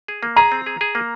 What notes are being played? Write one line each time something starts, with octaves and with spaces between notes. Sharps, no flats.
G#4
A#3
G#4 A#5
C4
G#4
G#4
A#3